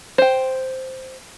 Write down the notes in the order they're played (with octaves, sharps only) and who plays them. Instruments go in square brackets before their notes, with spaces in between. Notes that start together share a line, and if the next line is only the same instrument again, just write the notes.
[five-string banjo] C5 G5